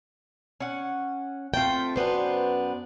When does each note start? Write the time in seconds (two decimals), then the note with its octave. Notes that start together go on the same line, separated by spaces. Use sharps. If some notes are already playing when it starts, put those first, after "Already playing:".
0.60 C#4 F#5
1.54 A3 C4 F4 G5
1.96 F#2 B3 D4 B4 C5